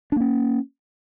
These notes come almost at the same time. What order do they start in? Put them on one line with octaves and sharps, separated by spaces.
D4 A#3 C#4